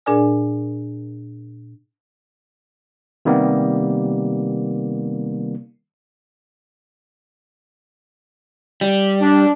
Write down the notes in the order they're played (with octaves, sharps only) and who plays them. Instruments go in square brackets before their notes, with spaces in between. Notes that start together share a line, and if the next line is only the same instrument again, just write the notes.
[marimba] A#2 D4 G#4 A#4 D5 G#5
[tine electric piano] C3 D#3 G3 A#3 B3
[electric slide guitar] G3
[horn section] D4